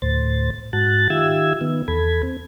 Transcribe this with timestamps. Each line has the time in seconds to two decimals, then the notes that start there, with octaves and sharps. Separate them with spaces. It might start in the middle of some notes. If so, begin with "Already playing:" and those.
0.02 D2 A2 C5 A6
0.73 G#2 F#4 A5 F#6 A6
1.10 D#3 F4 G4 E5 E6 G#6
1.61 D#3 B3
1.88 E2 A4 B5 G#6
2.23 C4